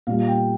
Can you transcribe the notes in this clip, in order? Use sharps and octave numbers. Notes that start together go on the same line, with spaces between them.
A#2 G3 F5
G5